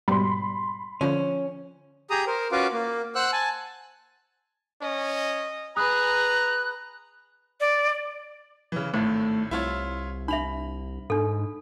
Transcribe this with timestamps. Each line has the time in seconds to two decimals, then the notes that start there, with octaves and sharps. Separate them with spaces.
0.08 G#2 B2 G3 B5 C6
1.01 D3 F3 C#4
2.10 G4 G#4 A#5 D#6
2.27 A#4 C5
2.52 C#4 F4 F#4 B4 F5 D6
2.72 A#3
3.15 C5 F#5 E6 F#6
3.33 G#5 A5
4.82 C#4 D#5
5.77 G#4 B4 A#5 B5 D#6 F#6
7.60 D5
8.72 C#3 E3
8.94 G#1 A2 A3 C5
9.51 C2 E4 F4 C#5
10.28 D4 E5 B5 F7
11.10 G#2 D4 A4